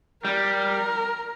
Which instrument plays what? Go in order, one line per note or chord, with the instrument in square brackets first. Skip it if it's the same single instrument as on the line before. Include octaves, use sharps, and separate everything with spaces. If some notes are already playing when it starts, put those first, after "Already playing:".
[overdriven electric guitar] G3 [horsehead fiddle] A#4